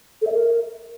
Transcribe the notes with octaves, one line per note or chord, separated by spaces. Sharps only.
A4
E5
A#4